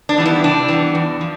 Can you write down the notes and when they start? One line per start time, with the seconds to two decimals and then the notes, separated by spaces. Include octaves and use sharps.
0.09 D4
0.18 E3 G3 B3
0.26 E4
0.44 C3 D4
0.68 E3 G3 B3
0.95 E2
1.21 F3